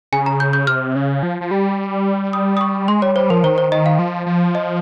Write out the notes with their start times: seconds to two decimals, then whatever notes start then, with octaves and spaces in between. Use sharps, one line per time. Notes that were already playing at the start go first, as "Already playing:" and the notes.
0.12 C#3 G#5
0.26 A#5
0.40 G6
0.53 G6
0.67 C3 F6
0.95 C#3
1.23 F3
1.41 F3
1.51 G3
2.33 D#6
2.57 D#6
2.61 C#6
2.88 G#3 C6
3.02 G3 C#5
3.16 G3 C5
3.30 F3 A#4
3.44 D#3 C5
3.58 C5
3.72 D#3 D#5
3.86 F5
3.99 F3
4.26 F3
4.55 D#5